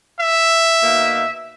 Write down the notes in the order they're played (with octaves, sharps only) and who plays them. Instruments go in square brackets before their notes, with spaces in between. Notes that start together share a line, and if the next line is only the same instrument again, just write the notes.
[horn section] E5
B2 A#3 D#4